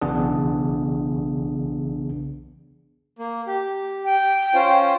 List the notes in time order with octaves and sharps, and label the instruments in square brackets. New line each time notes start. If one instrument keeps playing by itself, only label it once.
[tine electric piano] B1 C#3 E3 B3 D4 G#4
[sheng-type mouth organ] A#3
G4
[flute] G5
[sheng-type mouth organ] C#4 F4 C5